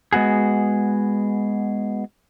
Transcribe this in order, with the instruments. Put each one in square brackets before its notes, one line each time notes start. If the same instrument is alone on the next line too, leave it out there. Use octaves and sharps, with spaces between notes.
[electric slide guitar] G#3 B3 F#4 G#4